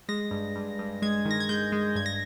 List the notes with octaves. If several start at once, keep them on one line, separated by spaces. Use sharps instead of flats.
G#3 A#6
G2
G2
G2
G#3 G#6
D#3
A#6
G#6
G#3 G6
G#3
G2 G#6
A#6